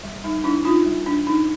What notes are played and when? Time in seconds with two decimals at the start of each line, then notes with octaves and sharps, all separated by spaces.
0.04 G3
0.24 G3 D#4
0.44 D4 E4
0.65 D4 D#4 F4
0.86 G3
1.06 D4
1.27 D4 D#4